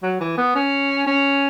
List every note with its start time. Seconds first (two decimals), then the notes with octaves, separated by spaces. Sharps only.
0.03 F#3
0.20 E3
0.37 B3
0.55 C#4
1.07 C#4